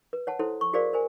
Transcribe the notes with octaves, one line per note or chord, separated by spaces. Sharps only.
B4
C#5 F#5 A5
E4 A4 C5 C#5 C6
C#6
F#4 G#4 A#4 C5 D5 F5
A#4 C5 G#5